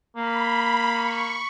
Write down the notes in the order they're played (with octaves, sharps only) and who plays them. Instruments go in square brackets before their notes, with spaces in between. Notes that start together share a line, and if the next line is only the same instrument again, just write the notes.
[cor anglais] A#3 [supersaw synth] B5
[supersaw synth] C#6